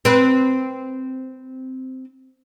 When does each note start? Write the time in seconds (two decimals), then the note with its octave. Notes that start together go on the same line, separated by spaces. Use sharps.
0.05 C4 B4